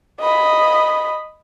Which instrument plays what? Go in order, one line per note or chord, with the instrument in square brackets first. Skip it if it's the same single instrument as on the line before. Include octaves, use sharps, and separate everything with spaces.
[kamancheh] D#5 B5